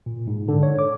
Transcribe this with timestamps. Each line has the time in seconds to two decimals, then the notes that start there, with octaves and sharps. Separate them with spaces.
0.06 A#2
0.27 G#2
0.48 D3
0.63 C#5
0.79 D6